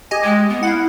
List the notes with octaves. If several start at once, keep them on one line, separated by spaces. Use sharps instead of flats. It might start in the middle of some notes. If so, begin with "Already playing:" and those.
G4 D#5 G#5
G#3
B3
E4 F5 F#5